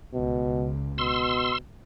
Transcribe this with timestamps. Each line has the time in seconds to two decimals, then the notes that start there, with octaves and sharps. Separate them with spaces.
0.14 C#2 B2
0.98 B2 C6 E6